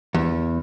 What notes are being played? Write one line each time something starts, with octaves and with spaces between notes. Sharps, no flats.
E2